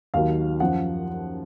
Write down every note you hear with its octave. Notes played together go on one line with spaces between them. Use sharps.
D#2 D#3 F#3 F5
F#2 F3 F#5